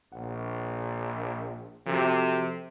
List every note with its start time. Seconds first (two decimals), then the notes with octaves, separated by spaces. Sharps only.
0.12 A#1 F#5
1.86 C3 F3 F#4 A4